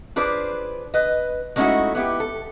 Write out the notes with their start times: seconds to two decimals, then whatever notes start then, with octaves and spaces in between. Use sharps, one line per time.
0.16 D4 F4 G#4 B4 C5 D5
0.94 B4 D#5
1.56 G#3 A3 C#4 D#4 E4 F#4
1.95 B3 E4 F#4 G4
2.20 A4